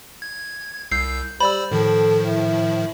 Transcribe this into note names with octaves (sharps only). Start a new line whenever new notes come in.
G#6
C2 E6 G6 C7
G3 C5 D5 B5 E6
A2 D#3 F3 A4
E4